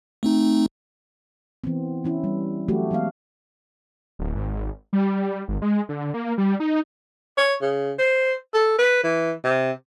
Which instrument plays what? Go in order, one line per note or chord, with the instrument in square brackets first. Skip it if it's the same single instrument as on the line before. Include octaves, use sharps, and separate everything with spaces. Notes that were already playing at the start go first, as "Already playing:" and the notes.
[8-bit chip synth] A3 C4 D#4
[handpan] E3 B3 C4
E3 C#4 E4
G3
E3 F#3 A3 F#4 G4
E3 G#3 B3 F5
[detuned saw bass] D1
G#1
G3
G#1
G#3
D3
A#3
G3
D#4
[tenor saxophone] C#5
C#3
C5
A4
B4
E3
C3